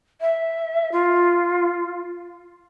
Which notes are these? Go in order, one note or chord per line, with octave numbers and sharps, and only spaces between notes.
E5
F4